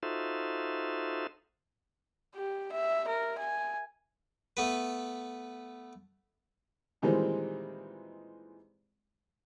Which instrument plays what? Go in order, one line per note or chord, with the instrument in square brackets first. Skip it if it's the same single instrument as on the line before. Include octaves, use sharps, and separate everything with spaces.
[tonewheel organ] D#4 F4 F#4 A4 C5 E5
[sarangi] G4
E5
A#4
G#5
[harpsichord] A3 B3 B4
[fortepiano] A#2 D#3 E3 G3 G#3 C4